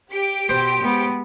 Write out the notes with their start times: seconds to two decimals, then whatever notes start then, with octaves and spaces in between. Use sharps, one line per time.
0.12 G4 D7
0.49 B2 C5
0.83 G#3 B3